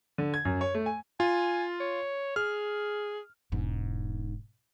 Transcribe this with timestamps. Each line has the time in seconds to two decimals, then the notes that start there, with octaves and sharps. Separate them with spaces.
0.18 D3
0.34 G#6
0.45 F#2
0.61 C#5
0.75 A3
0.86 G#5
1.20 F4 G#5
1.80 C#5
2.36 G#4 F6
3.52 E1 G#2